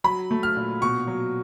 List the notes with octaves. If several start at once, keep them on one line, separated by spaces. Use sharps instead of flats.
F#3 B5
A3
F6
A#2
B2 C#6
F#3